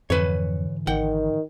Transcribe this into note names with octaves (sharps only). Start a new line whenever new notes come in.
F2 G#2 D3 E3 B4 C#5
G#1 D#3 F#5 G5